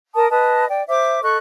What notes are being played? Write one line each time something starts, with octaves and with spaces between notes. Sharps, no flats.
A#4 A5 D#6
B4 D#5 A5 D#6
D5 G5
C5 E5 D6
A4 D#5 C#6 F#6